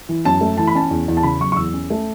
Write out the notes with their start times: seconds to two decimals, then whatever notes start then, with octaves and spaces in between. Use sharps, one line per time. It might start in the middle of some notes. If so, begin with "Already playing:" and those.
0.09 E3
0.25 F#2 A5
0.41 A3
0.58 E3 A5
0.67 B5
0.75 C#4 A5
0.91 E2
1.08 E2
1.17 A5
1.23 C#3 B5
1.40 F#3 C#6
1.52 C#6
1.56 E2 E6
1.74 C#4
1.90 A3